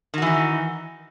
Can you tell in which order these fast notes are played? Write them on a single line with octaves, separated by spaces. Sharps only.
D#3 F#4 E3 D#4